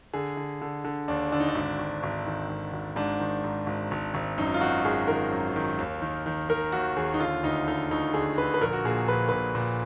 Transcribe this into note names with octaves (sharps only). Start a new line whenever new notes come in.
D3 G#4
D3
D3
D3
D#2 D4
D3 D4
D#4
D4
G#1
G#1
G#1
D#3
G#1
G#1
G#2 D4
D#3
G#2
G#1
G#1
G#1
F#2 D#4
F4
D#3 F#4
G#1 G#4
D#3 A#4
F#2
D#3
D#2
D#3
D#3
D#3 A#4
D#2 F#4
D#2 G#4
D#4
D3 F4
D2 D#4
D3 D#4
D2 D#4
D3 G#4
D3 B4
B4
A#1 A#4
F#4
A#2 G#4
A#1 B4
A#2 B4
A#2